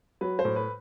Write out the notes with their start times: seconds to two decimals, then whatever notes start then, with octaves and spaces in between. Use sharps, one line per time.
0.21 F#3 B4
0.39 C5
0.45 A2
0.56 B4